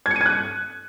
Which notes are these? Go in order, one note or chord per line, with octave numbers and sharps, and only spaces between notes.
G#6
C#7
D#7
G#6
F#6